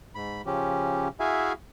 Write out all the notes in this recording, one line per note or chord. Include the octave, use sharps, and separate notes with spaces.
G#2 B5
C#3 F3 C#4 G4
E4 F#4 G#4 E5 F5 G#5